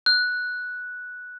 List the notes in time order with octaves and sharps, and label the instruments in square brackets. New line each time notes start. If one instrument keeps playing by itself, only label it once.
[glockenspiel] F#6